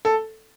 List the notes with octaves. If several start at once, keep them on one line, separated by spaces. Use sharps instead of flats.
A4